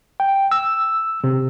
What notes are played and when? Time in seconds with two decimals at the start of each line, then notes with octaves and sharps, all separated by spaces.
0.20 G5
0.51 E6
1.24 C3